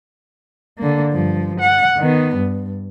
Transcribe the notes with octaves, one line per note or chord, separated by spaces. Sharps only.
D3 A#3
G2 F3
F#5
D#3 B3
G2